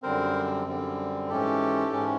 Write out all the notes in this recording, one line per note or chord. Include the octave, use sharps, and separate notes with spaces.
F#2 D3 G3 C4 A#4 C5
F#2 D3 G3 C4
G#2 E3 G#3 C#4 G4 A4
G#2 E3 G#3 C#4